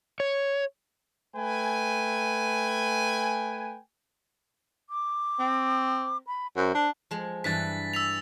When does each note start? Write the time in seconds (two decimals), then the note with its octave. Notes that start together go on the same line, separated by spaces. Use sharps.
0.20 C#5
1.36 A3 B4 G5 G#5
4.89 D6
5.39 C4
6.27 B5
6.56 F#2 C5
6.74 D4
7.11 F3 G#3
7.44 G2 E3 G3 A6 B6
7.94 E6 B6 F7